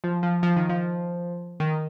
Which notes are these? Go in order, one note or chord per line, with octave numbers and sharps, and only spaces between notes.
F3
F3
F3
D#3
F3
D#3